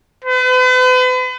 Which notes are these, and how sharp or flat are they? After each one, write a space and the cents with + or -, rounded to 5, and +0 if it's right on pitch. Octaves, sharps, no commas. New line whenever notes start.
B4 +40